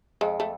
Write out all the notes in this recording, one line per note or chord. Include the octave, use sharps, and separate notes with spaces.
F2 G#3
A3